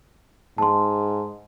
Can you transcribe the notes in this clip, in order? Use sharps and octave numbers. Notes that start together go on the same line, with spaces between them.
G#2 A5 C6